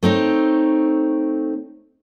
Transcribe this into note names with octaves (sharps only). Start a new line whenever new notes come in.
A3 C4 D#4 C#5